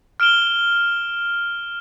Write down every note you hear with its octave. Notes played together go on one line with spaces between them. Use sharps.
F6 D7 E7 G7